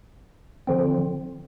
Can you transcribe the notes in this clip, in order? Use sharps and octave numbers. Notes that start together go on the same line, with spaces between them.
D3 F3 C4